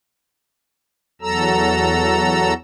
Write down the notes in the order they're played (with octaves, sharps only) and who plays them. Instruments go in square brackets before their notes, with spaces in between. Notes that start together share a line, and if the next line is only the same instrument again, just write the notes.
[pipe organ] E2 F#3 A4 A#5 E6